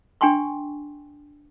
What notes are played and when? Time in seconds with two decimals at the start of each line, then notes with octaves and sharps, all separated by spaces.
0.21 D4 G5 G#5 C6 C#6